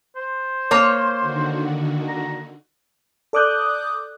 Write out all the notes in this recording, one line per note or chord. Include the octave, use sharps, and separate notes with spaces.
C5
A#3 C#5
D3 D#3 F#4
A#5
A4 D5 D6 D#6 F#6 G6